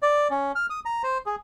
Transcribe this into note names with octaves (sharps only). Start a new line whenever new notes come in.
D5
C#4
F6
D#6
A#5
C5
G#4